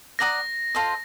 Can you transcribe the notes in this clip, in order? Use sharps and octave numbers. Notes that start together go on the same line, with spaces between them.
D5 F#5 A#5 D#6 A#6
F4 A4 C5 D#5